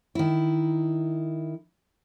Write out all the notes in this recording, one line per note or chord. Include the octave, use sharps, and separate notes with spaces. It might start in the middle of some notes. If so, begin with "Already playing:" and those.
D#3 E4